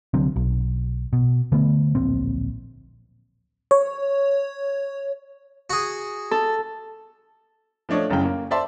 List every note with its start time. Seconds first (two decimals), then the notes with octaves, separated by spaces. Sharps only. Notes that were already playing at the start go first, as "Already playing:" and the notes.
0.14 C2 D3 F#3 C4
0.36 B1
1.13 B2
1.52 D3 A3 B3
1.95 D1 A#1 C4
3.71 C#5
5.70 F#4 G#4
6.31 A4
7.89 F3 A3 D4 C#5 D#5
8.10 F#1 F#2 A2 C#3 G5
8.25 A#3
8.51 C5 D5 E5 A5 C6